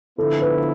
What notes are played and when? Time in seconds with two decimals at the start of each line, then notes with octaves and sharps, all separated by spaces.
0.18 D3 F3 B3 E4 A4
0.42 B4